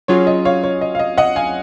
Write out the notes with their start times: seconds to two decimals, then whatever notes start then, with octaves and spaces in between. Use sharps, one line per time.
0.08 F#3 C#4 F4 G#4 C#5
0.27 D#5
0.45 C#5 F5
0.64 C#5
0.81 D#5
0.95 F5
0.99 D#5
1.18 D#5 F#5
1.36 F5 G#5